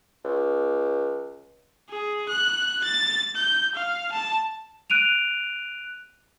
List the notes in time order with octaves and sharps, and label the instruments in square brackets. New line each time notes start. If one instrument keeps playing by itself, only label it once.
[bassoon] C#2
[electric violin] G#4
F#6
A6
G6
F5
A5
[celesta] F#6 D7 D#7 F7